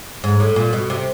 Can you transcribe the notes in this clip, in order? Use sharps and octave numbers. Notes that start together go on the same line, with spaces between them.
G#2
A2
A#2
B2
C3